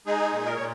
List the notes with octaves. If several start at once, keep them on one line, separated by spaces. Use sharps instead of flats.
G#3 D#4 G#4
A#2
A#4
A#2 C#5